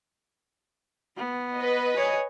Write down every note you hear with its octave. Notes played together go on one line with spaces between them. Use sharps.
B3
B4 D#5
G#4 C#5